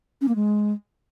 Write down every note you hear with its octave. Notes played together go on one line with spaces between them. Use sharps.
C#4
A#3
G#3